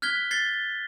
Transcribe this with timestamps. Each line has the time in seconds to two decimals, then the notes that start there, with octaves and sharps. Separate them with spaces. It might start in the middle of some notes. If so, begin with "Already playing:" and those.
0.02 F6 F#6 G#6 B6 G7
0.31 G#6 A6 C7 G7